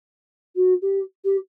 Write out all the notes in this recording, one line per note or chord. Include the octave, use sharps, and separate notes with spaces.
F#4
G4
G4